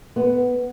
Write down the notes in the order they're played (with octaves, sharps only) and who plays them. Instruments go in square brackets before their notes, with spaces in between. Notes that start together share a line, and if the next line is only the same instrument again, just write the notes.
[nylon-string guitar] B3